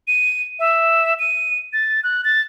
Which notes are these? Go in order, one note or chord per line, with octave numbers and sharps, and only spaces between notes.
D#7
E5
D#7
A6
F#6
A6